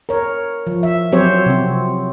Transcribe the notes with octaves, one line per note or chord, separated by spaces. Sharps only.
A#4 C#5
F3
E5
F#3 C4 G4 C5 C#5
C3 C4